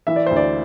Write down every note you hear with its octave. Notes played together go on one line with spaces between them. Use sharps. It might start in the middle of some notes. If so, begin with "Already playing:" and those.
E3 E5
D5
D2 C5
D5